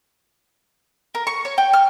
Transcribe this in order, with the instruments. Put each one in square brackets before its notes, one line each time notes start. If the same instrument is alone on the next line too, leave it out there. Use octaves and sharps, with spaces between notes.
[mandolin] A#4
C#6
C#5
G5
F6